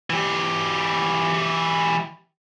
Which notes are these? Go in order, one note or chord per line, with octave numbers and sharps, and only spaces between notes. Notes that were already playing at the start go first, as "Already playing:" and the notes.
E3 G4